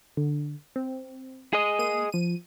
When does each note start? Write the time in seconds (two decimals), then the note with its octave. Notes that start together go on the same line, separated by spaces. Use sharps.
0.17 D3
0.76 C4
1.53 G#4 D#5
1.79 A#3 D#7
2.12 F3 D#7